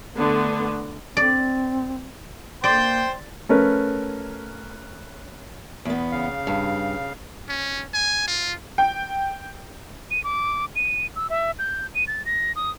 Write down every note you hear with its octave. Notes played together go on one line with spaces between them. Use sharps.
D3 A3 B3
C4 D5
A#3 C5 D5 G5 C6
A3 C#4 A#4 B4
E2 B3
C#3 F5
G2
C#4
G#5
F4
G5
D#7
D6
D#7
E6
E5
G6
D#7
A6
A#6
D#6